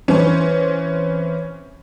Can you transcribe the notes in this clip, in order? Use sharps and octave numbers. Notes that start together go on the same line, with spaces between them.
E3 C4 C#4